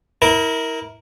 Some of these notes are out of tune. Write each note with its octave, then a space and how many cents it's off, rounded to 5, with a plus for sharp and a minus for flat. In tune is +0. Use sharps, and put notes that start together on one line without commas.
E4 -30 A#4 +0